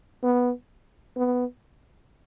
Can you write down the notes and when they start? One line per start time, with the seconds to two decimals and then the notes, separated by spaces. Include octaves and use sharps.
0.23 B3
1.17 B3